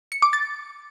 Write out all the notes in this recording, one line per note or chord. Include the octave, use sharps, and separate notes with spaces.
C#7
D6
A6